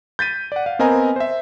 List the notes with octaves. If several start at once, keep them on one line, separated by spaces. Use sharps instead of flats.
G6 A6 B6 D#7
D5 F#5
F5
B3 C4 A#4 D#5 G#5 A#5
C5 E5